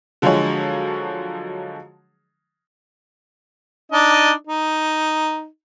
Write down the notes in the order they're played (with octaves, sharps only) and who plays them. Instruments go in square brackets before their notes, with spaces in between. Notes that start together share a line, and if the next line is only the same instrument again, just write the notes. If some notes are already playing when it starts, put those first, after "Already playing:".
[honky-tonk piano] D3 F3 F#3 G#3 G#4 C#5
[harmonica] D4 D#4 D#5
D#4